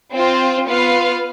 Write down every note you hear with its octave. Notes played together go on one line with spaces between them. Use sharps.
C4 F4 C5
B3 F4 B4 F5